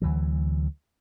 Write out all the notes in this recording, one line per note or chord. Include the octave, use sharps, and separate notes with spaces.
D2 E3 F#3